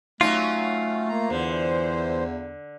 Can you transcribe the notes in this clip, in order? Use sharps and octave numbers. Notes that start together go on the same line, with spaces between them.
F#3 A3 C#4 D#4 F4
A#3 A#5
E2 D3 E3 C5